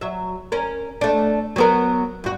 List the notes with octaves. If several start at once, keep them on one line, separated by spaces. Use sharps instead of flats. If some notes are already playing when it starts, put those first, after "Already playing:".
F#3 E5
C#4 A#4
A3 D4
F#3 B3 A#4
G2 F#4